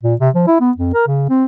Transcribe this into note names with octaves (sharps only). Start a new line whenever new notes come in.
A#2
C3
F3
E4
B3
F2
A#4
C#3
C4